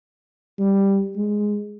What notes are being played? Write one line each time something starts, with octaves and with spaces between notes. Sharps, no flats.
G3
G#3